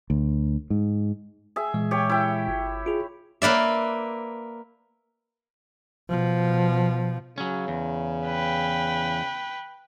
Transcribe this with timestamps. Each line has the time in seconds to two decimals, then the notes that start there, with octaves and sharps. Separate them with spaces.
0.10 D2
0.70 G#2
1.56 G#4 E5
1.74 A#2 E3 G#3
1.91 G4 C#5
2.10 E4 G5
2.48 G1
2.86 F4 G#4
3.42 A#3 B4 D5 E5
6.09 B2 F3
7.38 C#3 F#3 C#4
7.68 E2
8.26 B4 G5